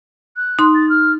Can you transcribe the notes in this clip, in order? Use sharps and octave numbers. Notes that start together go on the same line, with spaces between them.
F#6
D#4 C6
A6
F6